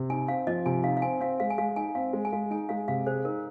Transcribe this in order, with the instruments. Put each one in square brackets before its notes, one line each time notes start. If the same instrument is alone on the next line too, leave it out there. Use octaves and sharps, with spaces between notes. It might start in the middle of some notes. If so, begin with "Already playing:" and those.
Already playing: [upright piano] C3
[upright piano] D#4 [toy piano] G#5
[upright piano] C4 [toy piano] F5
[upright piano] F3 [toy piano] D#5
[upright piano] C3 [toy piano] G#5
[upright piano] D#4 [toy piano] F5
[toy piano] F5
[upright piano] C4 [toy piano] G#5
[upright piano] C4 [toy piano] F5
[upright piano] G#3 [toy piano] F5
[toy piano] G#5
[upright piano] G#3 [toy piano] F5
[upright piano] D#4 [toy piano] G#5
[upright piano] C4 [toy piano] F5
[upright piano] G#3
[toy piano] G#5
[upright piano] G#3 [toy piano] F5
[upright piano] D#4 [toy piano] G#5
[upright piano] G#3 [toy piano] F5
[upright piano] C3 [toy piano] F5
[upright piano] G#4 [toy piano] C5
[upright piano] D#4 [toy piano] A#4